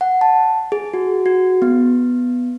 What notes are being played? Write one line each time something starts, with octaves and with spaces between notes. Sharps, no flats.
F#5
A5
G#4
F#4
F#4
B3